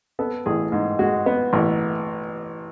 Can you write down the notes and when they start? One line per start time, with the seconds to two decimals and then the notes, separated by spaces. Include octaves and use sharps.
0.19 B3 A4
0.46 A1 G#4
0.72 G#2
0.99 G#3 F#4
1.26 B3
1.53 A1